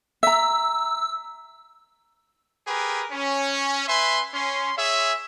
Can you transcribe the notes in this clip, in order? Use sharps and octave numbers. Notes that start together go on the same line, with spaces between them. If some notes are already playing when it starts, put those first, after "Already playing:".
E5 A#5 E6
G4 G#4 A#4 B4
C#4
B4 E5 G#5 C6
C#4 C6
G#4 C#5 E5